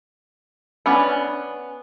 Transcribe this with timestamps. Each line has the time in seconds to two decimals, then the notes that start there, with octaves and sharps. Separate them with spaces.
0.86 B3 C#4 D4 B5